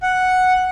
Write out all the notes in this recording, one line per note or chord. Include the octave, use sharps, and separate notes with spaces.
F#5